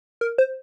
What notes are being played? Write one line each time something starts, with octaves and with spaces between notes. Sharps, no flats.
A#4
C5